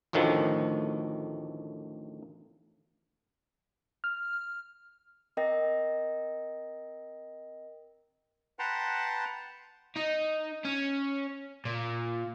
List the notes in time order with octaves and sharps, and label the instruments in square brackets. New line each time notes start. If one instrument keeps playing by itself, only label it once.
[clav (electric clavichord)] A1 D2 A2 D#3 F3
[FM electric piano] F6
[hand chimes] C4 A#4 D#5 G5 A#6
[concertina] B4 F#5 G5 A5 A#5 C6
[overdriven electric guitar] D#4
C#4
A#2